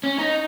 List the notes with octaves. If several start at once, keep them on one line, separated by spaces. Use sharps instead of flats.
C#4
D#4